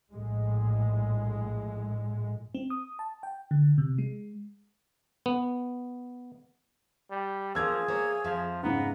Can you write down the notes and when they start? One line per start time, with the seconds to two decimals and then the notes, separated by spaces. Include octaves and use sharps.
0.13 A#1 A2 G#3
2.55 C4
2.70 D#6
2.99 A5
3.23 G5
3.51 D3
3.78 C3
3.98 G#3
5.26 B3
7.10 G3
7.55 F3 A#3 D4 G#4 A#4 E6 G#6
7.88 A#3 C5 C#5 E5
8.24 F2 F3 E5 F5
8.63 G#2 C#3 B3 A#5